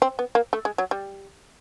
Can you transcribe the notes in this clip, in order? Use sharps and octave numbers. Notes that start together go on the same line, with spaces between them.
C4
B3
A#3
A3
G#3
F#3
G3